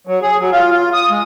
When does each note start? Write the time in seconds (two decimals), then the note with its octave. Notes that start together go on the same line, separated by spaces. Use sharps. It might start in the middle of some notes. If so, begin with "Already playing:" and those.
0.07 F#3
0.22 G#4
0.39 F#3
0.52 F4
0.71 F4
0.93 D#6
1.10 G#3